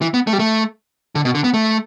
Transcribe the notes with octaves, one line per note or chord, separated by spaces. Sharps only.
E3
B3
A3
G3
A3
D3
B2
D3
B3
A3